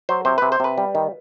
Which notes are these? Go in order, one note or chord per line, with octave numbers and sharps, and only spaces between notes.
F#3 C5
C3 C5
C3 B4
C5
C3 B4
G3
D#3